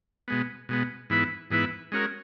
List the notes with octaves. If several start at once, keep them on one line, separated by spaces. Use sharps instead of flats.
B2 G#3 B3
B2 G#3 B3
G#2 E3 B3 E4 B4
G#2 E3 B3 E4 B4
G#3 C#4 F#4 A#4